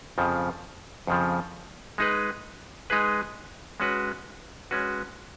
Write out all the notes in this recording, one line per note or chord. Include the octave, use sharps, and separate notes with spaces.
F2 C#3 F3
F2 C#3 F3
G#3 D#4 G#4 B4
G#3 D#4 G#4 B4
G#3 C#4 F#4 B4
G#3 C#4 F#4 B4